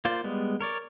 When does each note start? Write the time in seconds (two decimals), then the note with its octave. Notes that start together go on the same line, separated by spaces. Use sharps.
0.05 A#3 F4 C5 D5
0.24 G3 G#3 B3
0.61 A#4 C#5 D5